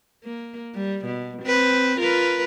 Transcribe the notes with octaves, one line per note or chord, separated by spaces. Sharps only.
A#3
G3
B2
C4 B4
F4 A#4 B4